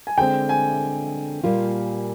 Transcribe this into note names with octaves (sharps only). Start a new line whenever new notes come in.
G#5
D3 G#3 C4 G5
G#5
A#2 G3 A#3 F4